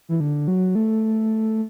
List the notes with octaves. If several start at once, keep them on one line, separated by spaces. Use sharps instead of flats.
E3
D3
F#3
A3